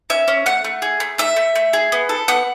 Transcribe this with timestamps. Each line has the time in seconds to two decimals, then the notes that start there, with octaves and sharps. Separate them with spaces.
0.10 C#4 E5
0.28 C#4
0.46 A3 F#5
0.64 A3
0.82 G#4
1.00 A3
1.18 A3 E5
1.36 A3
1.56 A3
1.73 G#4
1.92 B3
2.09 A4
2.28 B3 F#5